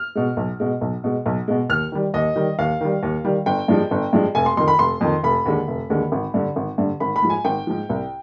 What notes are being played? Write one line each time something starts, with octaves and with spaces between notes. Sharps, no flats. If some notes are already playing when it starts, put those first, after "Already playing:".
Already playing: F6
B2 G#3
B1
B2 G#3
B1
B2 G#3
B1
B2 G#3
D#2 F6
D#3 G3
D#2 D#5
D#3 G3
D#2 F5
D#3 G3
D#2
D#3 G3
G1 G5
G2 F3 G#3
G1
G2 F3 G#3
F1 G#5
C6
F2 D#3 C6
B5
F1 C6
F2 D#3
F1 B5
D#2 D3 G#3
F1
D#2 D3 G#3
G#1
G2 D3
G#1
G2 D3
G#1 B5
B5
G#2 F3
G#5
G#1 G5
G#2 F3
C2